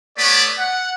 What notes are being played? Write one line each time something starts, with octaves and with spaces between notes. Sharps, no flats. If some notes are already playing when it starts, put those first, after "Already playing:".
A3 B3 C#5 D5
F#5